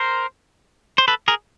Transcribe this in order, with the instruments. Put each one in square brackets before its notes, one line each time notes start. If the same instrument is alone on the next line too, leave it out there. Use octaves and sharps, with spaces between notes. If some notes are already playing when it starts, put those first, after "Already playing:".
Already playing: [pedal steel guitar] A#4 C5
C5
A4 B4
G#4 A#4